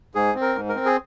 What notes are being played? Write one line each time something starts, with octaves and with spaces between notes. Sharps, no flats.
G#2 G#4
C4
A#4
G#2
A#4
C4
G#4